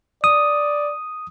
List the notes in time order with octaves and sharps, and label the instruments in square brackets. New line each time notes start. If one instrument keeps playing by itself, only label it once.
[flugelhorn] D5 [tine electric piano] D#6